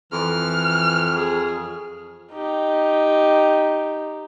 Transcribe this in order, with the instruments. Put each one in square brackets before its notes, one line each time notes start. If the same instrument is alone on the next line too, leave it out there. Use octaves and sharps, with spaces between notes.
[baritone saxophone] F2 [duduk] E3 [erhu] F6
[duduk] G#4
[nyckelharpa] D#4 G4